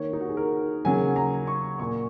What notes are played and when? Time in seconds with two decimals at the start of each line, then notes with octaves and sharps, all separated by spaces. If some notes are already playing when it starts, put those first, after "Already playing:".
Already playing: D#3 A#3 C#5
0.13 D#4
0.21 F#4
0.29 G#4
0.37 A#4
0.85 C#3 F#3 A#3 G#5
1.16 A#5
1.47 C#6
1.79 A#2 A#3 C#6